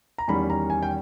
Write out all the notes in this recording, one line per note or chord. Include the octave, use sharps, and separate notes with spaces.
A#5
E2 D#3 G3 C#4 B5
A#5
G#5
G5